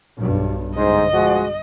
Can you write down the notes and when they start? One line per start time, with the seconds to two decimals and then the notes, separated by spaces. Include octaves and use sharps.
0.18 B1 G2
0.77 G1 G#2 C5 D#5
1.14 F3 G#3 F#4